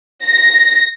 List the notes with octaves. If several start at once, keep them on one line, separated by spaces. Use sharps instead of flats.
A#6